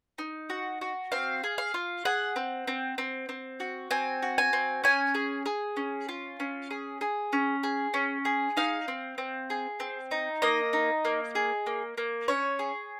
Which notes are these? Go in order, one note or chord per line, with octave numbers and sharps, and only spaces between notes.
D#4
F#4
F#4
C4 F5
G#4
F5
F4
G#4 F#5
C4
C4
C4
C4
F#4
C4 G#5
F#4
G#5
C4
C#4 G#5
G#4
G#4
C#4
F4
C#4
G#4
G#4
C#4
G#4
C#4
G#4
D#4 F5
C4
C4
G#4
C4
D#4
A#3 D#5
D#4
A#3
G#4
A#3
A#3
C#4 C#5
G#4